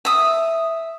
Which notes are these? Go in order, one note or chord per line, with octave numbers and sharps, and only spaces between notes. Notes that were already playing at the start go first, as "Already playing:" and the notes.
E5 D#6